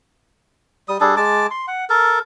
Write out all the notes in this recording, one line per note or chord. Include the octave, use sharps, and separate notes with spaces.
G3 D#6
G3 D4 G#4 A4
G#3 A5 D6
C6
F#5
A4 A#4